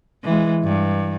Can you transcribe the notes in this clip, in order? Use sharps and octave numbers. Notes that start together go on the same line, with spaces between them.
E3 G#3
G2